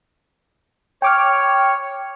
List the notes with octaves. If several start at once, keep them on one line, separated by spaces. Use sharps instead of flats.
C#5 G5 D6 F6